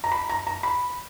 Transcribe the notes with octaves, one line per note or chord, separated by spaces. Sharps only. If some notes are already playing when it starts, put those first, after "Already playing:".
A#5
B5
A#5
A#5
B5